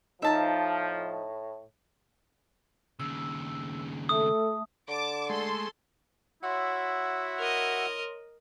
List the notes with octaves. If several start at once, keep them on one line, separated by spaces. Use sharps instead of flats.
A2 F3 D#4 E5 A5 A#5
D#2 C#3 E6
A3 A4 E5 A5 D#6
D3 A5 D6
G#3 A3 A4 C6
E4 F#4 C#5 E5 F#5 C6
A#4 D#5